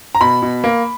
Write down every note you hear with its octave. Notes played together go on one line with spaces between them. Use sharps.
A#5
B2 B5
B2
A#3